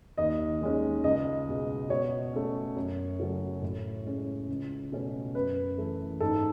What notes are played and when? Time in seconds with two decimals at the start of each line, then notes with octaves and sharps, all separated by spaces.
0.18 D#2 D#5
0.61 D#3 G#3 C#4
1.04 C#2 D#5
1.48 B2 G#3
1.90 B2 C#5
2.33 A3 C#4
2.76 F#2
3.19 C#3 F#3 A3 C#4
3.62 A2
4.05 G#3 C#4
4.49 C#2
4.92 B2 A3 C#4
5.35 F#2 B4
5.77 E3 A3
6.20 G#2 A4